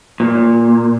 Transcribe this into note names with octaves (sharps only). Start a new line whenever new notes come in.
A#2